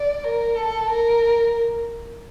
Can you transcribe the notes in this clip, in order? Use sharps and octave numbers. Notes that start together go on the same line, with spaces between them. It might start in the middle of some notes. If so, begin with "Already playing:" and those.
Already playing: D5
A#4
A4
A#4